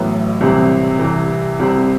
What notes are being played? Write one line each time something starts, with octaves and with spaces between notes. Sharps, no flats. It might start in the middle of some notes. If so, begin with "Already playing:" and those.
Already playing: A1 A2 F#3 B3
C2 C3 E3 G3 C4
C2 C3 E3
C2 C3 G3 C4